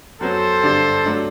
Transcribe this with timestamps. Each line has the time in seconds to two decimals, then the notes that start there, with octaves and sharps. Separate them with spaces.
0.21 F#2 F#3 B3 A4 C5
0.63 G2 D3 G3 D4
1.05 F#3 A3 D4